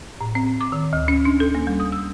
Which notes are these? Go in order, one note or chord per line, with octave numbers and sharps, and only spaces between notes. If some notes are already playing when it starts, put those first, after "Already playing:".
A2
C4
D6
D#3
D2
C#4
D4
A4
A#3
G3
D#6
E6